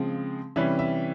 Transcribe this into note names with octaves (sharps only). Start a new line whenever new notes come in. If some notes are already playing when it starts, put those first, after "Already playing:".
Already playing: C#3 F3 G#3 C4
C3 E3 G3 C#4 E5
E5